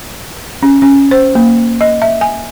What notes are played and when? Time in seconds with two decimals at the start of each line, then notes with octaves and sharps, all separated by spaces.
0.63 C#4
0.82 C#4
1.11 C5
1.35 A#3
1.81 D#5
2.02 E5
2.21 G#5